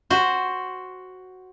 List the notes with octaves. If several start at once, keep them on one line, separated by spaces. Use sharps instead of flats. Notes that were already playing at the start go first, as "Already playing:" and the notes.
F#4 C5